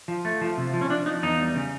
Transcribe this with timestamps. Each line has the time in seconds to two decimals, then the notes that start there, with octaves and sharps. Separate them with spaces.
0.08 F3
0.25 A3
0.41 F3
0.57 C3
0.74 F3
0.81 C#4
0.90 F3 D4
1.06 F3 D#4
1.23 E2 D#4
1.39 G3
1.55 C#3